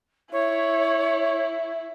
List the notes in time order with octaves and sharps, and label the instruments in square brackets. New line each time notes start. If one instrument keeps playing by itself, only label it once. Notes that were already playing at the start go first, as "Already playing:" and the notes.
[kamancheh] E4 [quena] C#5